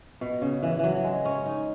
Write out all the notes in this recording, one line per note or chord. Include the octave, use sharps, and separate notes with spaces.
B2
C#3
E3
E3 F#3
G#3
C#4
D#4